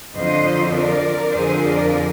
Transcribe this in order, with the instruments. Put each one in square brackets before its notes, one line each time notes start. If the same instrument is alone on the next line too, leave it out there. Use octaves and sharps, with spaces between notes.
[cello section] F2 D3 F3 C5 D#5
A#4 D5
F2 D3 F3 G#4 C5
A#4 D5